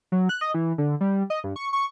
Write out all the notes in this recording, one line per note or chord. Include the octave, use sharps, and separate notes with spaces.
F#3
F#6
D#5
E3
D3
G3
D#5
G2
C#6
C#6